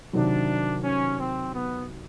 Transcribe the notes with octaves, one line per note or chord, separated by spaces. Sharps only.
C3 D#3 F#3 D4
C#4
C4
B3